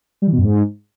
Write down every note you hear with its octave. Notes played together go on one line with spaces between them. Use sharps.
G3
E3
B2
F#2
G#2